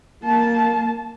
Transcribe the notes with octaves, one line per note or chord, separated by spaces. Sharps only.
A#3 A5